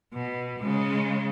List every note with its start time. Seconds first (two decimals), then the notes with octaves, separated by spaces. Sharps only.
0.13 B2
0.61 C#3 G#3